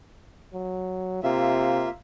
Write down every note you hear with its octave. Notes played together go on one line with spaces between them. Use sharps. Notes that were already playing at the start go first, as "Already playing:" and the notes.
F#3
C3 A#3 F4 E5